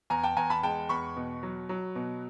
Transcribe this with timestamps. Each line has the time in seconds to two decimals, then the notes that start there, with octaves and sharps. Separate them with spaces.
0.10 E2 G#5 A#5
0.23 G5 A5
0.37 E2 G#5 A#5
0.50 A5 B5
0.63 G#3 G5 A5
0.89 E2 B5 C#6
1.17 B2
1.43 F#3
1.69 F#3
1.95 B2